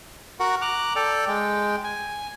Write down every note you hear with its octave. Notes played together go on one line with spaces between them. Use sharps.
F#4 A#4 F#5
A#5 D6 F#6
A4 D5 G5
G#3 G5
G#5